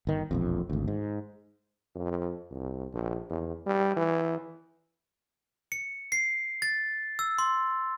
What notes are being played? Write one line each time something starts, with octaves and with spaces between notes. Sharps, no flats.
G1 D#3
E1 A#1 F2
G#1 D2
G#2
F2
C2
A#1
E2
G3
E3
C#7
C7
A6
E6
C6